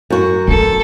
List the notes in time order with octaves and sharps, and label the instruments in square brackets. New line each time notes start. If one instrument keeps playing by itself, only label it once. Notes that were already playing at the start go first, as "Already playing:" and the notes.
[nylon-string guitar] F#2 F#4
[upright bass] A3 [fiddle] A4